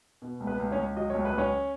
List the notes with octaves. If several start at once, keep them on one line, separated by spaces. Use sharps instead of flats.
B2
C#2
B3 B4
C#2
C#4 C#5
C#2
F#3 D#5
C#2 C#5
B4
C#2 C#4 C#5